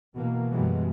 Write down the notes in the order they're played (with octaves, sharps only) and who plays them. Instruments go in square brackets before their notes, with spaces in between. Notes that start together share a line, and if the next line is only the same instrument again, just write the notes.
[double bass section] B2 E3 A#3
F#2 B2 E3 G3 G#3